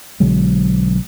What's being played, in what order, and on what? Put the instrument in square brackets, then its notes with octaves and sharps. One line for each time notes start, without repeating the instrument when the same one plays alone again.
[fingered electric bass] B1 D3 F#3 G#3